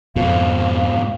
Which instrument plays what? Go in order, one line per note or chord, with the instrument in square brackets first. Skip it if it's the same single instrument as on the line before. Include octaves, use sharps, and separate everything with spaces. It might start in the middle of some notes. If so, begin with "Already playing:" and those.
[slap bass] F2 [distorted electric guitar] G#2 B2 [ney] F5